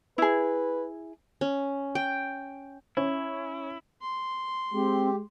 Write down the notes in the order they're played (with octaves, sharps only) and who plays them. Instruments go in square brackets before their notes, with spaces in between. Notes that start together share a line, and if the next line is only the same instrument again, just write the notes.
[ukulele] E4 G#4 [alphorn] B4
[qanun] C#4
G5
[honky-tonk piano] C#4 [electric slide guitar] E4
[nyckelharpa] C6
[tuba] G#3 [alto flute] C4 [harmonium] G4